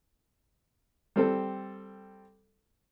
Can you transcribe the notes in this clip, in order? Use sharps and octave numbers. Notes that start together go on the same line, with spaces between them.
G3 C4 A4